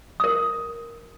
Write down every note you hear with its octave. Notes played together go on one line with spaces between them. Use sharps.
A#4 D#6